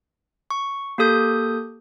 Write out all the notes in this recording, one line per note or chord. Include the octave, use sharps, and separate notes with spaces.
C#6
A#3 G4 A4 D#6 G6